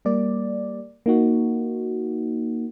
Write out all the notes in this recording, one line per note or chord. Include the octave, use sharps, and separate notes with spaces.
G3 A#3 D5
A#3 D#4 F#4